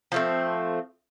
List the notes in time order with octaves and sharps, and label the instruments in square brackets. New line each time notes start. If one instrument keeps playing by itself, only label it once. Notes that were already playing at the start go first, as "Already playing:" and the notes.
[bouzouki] F3 A3 C4